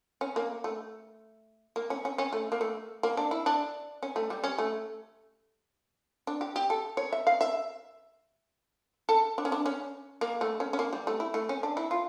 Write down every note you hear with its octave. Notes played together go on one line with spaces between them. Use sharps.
C#4
A#3
A3
A#3
C#4
C#4
C#4
A3
A#3
A3
A#3
D4
E4
D4
C#4
A3
G3
C#4
A3
D4
G4
G4
A4
C#5
E5
F5
E5
A4
D4
C#4
D4
C#4
A#3
A3
C#4
C#4
A#3
G3
A3
E4
A3
C#4
D4
E4
F4